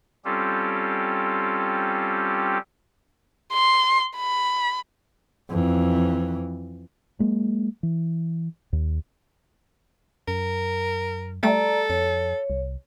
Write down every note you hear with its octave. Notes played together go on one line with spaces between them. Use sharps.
G3 C4 C#4 F4 G4 A4
C6
B5
F2 E3
F#3 G#3 A#3
E3
D#2
F#2 A#4
G3 A3 A4 D5 A#5
F2 C#5
C2